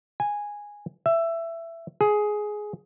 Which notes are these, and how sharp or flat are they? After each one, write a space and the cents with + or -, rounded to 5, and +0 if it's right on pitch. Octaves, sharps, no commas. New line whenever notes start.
G#5 -10
E5 +15
G#4 +10